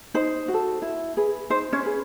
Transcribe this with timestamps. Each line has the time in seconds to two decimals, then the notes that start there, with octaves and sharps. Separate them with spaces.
0.14 D#4 C5
0.48 F#4
0.54 A4
0.82 E4
1.17 G#4 B4
1.50 D#4 C5
1.73 C#4 C#5
1.83 G#4 B4